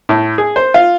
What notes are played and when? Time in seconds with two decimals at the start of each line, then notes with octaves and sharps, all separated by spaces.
0.09 A2
0.38 G#4
0.56 C5
0.74 F4